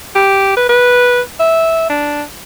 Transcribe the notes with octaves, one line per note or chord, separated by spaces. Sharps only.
G4
B4
B4
E5
D4